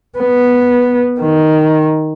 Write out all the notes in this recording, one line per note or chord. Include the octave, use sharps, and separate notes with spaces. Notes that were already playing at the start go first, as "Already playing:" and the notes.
B3
D#3